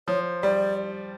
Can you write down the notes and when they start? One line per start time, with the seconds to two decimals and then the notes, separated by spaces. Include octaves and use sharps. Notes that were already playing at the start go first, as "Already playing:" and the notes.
0.08 F3 C#5
0.43 G3 D5